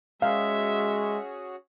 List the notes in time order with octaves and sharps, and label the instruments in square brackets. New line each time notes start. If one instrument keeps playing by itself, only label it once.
[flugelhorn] G#3 [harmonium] C#4 F#4 G#4 [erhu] E5 [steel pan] F5